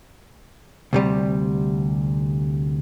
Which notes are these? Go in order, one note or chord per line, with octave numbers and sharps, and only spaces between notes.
D2 C3 G3